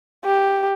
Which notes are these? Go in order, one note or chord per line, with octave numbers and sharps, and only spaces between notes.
G4